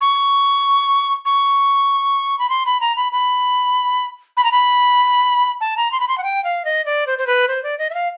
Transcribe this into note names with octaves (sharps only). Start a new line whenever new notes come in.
C#6
C#6
B5
C6
B5
A#5
B5
B5
B5
A#5
B5
A5
A#5
C6
B5
C6
F#5
G5
F5
D#5
D5
C5
C5
B4
C5
D5
D#5
E5
F5